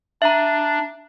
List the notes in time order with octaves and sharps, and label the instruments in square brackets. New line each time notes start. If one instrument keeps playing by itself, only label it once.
[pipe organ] D4 [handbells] E5 A#5